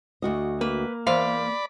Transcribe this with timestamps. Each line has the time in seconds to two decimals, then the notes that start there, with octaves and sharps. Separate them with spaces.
0.22 D2 F#4 D#5
0.61 A#3 B4
1.07 E2 C5 D5 F5 B5